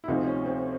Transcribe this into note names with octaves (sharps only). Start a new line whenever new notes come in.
E4
D2 C3 F3 D#4
C#4
C4